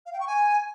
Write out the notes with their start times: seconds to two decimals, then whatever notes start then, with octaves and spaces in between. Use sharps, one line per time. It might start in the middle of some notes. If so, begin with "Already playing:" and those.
0.06 F5
0.13 G5
0.20 C#6
0.27 G#5